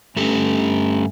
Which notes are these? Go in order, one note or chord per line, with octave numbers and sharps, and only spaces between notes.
G2 A3 C#4 G4 A4